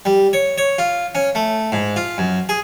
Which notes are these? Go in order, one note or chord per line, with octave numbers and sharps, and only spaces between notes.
G3
C#5
C#5
F4
C#4
A3
G#2
F4
F#2
G#4